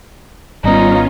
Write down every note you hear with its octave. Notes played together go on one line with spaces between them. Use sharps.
G#1 G3 B3 C#4 D#4 F4